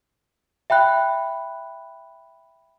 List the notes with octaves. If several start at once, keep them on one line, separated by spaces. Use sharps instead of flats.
E5 G5 B5 F#6